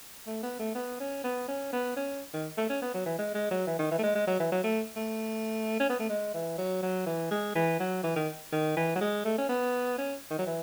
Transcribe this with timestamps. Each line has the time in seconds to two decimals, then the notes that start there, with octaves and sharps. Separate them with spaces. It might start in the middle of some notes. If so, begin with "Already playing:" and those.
0.27 A3
0.43 B3
0.59 A3
0.75 B3
1.00 C#4
1.24 B3
1.48 C#4
1.73 B3
1.96 C#4
2.34 D#3
2.57 A3
2.69 C#4
2.82 B3
2.94 F#3
3.06 E3
3.18 G#3
3.34 G#3
3.51 F#3
3.67 E3
3.79 D#3
3.91 E3
3.98 A3
4.03 G#3
4.15 G#3
4.27 F#3
4.40 E3
4.52 F#3
4.64 A3
4.96 A3
5.80 C#4
5.89 B3
5.99 A3
6.09 G#3
6.34 E3
6.58 F#3
6.82 F#3
7.06 E3
7.31 G#3
7.55 E3
7.80 F#3
8.03 E3
8.16 D#3
8.52 D#3
8.76 E3
8.95 F#3
9.01 G#3
9.25 A3
9.38 C#4
9.49 B3
9.98 C#4
10.30 D#3
10.38 F#3
10.46 E3